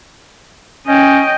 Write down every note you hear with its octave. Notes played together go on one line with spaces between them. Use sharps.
C#4 D#5 G5